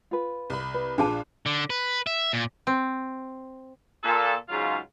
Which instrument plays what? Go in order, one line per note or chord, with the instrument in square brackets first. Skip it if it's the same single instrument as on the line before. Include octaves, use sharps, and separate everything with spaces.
[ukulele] F4 B4
[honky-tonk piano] C2 B5
[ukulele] B4
[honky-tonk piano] A#1 F4 [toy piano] D4 G#4 A5
[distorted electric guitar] D3
B4
E5
A#2
[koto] C4
[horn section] A#2 A4
G#2 C#3 F#3 F4